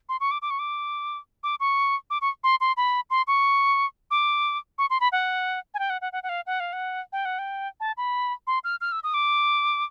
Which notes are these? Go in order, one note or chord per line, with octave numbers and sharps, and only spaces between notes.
C6
C#6
D6
D6
C#6
D6
D6
C#6
D6
C#6
C6
C6
B5
C6
C#6
D6
C#6
C6
B5
F#5
G#5
G5
F#5
F#5
F#5
F#5
F5
F#5
F5
F#5
G5
F#5
G5
A5
B5
C6
F6
F6
E6
D#6
D6